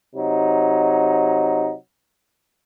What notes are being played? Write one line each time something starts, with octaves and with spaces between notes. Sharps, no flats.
C3 F#3 D#4